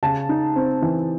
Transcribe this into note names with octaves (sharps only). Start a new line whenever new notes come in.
C#3 A5
D#4
C4
E3